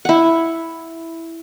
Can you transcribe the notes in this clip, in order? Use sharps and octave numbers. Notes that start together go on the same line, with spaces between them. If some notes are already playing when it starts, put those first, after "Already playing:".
E4 F#5